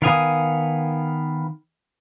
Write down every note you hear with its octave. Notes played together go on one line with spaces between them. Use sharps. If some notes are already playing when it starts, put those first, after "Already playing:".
D#3 B3 F5 G#5 D#6